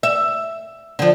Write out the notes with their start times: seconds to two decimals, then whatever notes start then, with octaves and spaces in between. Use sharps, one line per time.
0.03 E5
0.99 D3 F3